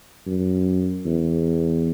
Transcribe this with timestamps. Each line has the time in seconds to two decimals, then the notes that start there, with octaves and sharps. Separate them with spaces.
0.27 F#2
1.06 E2